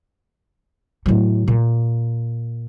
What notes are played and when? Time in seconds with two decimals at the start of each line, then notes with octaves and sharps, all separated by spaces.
1.06 A2 F#3
1.48 A#2